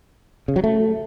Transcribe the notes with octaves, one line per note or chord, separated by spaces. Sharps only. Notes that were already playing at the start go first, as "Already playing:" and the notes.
C#3
F#3
A3